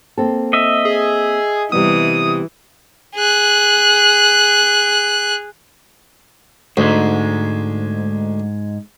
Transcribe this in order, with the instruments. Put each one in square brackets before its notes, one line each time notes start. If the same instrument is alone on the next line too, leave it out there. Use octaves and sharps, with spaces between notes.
[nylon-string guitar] A#3 C4 A4
[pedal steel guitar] D#5 E5
[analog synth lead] G#4
[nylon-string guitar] C3 G3 B3 [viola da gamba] E3 [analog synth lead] D#6
[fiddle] G#4 F#6
[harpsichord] D2 [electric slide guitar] G#2 G#3